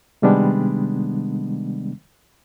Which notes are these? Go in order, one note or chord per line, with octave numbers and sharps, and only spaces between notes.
C3 D#3 G3 G#3 B3 D4